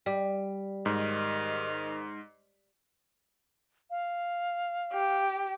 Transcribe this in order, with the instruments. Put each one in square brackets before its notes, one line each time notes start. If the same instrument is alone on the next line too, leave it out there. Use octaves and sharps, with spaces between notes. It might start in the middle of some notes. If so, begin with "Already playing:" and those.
[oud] G3
[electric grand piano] G#2 [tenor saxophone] D#3
[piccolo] F5
[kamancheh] G4